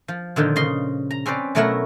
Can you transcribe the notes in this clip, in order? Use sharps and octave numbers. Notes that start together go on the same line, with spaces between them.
F3
A#2 D3 D#3 F3
C#3 D#5 C6
A#5
C4 C#4 B4 C5 D5
B2 F#3 A3 E4 A#4 F#5